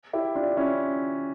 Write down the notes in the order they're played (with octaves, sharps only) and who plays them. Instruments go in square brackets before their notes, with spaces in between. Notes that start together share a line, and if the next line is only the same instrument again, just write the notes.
[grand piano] E4 G4
D4 F4
C#4 E4